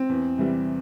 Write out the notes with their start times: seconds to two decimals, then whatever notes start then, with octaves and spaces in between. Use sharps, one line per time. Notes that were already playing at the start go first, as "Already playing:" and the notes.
Already playing: C4
0.09 E2
0.38 C3 E3 G3